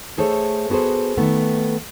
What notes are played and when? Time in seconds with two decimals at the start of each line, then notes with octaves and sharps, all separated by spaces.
0.18 A3 G#4 A4 C5 C#5
0.70 B3 F#4 G#4 A4 C5
1.18 D#3 A3 B3